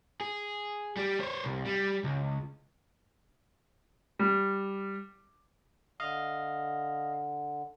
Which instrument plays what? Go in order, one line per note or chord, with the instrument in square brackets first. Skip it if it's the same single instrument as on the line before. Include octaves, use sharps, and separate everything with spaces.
[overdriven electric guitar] G#4
G3 G4
C5 C#5
C2
G3
C#2
[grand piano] G3
[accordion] D3 [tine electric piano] D#5 F5